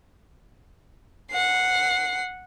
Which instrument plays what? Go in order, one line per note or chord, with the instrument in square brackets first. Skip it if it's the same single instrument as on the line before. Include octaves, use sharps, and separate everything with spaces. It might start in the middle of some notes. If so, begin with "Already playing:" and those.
[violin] F#5 C7